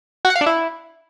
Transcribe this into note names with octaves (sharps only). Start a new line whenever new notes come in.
F#4
F#5
F5
D4
E4